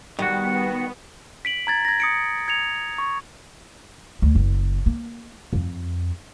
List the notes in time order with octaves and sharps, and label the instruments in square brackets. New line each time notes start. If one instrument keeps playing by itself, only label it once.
[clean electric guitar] D#3 F#4 [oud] G3 [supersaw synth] B3
[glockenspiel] B6 D7 F#7
A#5 G#6 A6
G#6 A#6
D#6 C#7 D7
G#6 C#7 F7
C#6
[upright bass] D2
F#1
A#3
F2